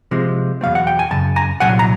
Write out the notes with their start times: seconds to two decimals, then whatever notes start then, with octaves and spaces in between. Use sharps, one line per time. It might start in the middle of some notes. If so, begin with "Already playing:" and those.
0.11 C3 F3 G#3
0.61 E2 B2 F#3 A3 C4 F5
0.75 F#5
0.87 G5
0.99 G#5
1.11 F#2 C#3 A5
1.36 G#5 A#5
1.60 C2 A#2 F#3 F#5 G#5
1.79 A#5